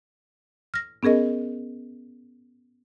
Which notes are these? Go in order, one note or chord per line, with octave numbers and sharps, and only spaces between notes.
F6 A#6
B3 C#4 G#4 A#4 D#5